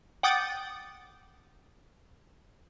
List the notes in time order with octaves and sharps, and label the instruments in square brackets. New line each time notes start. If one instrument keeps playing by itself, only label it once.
[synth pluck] F#5 G5 D6 D#6 G6 A6